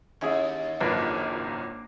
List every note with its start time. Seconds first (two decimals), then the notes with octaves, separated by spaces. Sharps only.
0.21 D#2 C#4 E4 G#4
0.81 G#1 C#2 F#2 F3 A#3 D4 A#4 B4